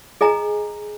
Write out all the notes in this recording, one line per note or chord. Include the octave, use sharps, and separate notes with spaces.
G#4 D#5 G#5 A#5